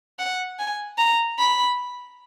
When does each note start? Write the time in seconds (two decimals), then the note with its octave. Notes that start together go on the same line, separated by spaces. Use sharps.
0.19 F#5
0.59 G#5
0.98 A#5
1.38 B5